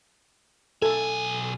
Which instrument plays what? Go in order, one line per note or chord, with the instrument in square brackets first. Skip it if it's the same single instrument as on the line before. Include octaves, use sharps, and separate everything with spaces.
[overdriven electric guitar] B1 G#5 [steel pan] A4